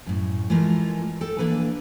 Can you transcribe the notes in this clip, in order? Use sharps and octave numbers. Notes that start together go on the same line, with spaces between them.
F#2 A2
E3 G#3 A3 F4 A#4
A4 G5
E3 A#3 D4 B4